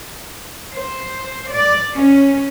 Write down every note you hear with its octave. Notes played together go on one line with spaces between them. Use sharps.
C5
D5
C#4